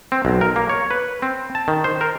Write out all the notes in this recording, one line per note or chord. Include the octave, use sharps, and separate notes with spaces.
C4
B1
A#4
A#3
C#5
B4
C4
A5
D#3
C5
A#4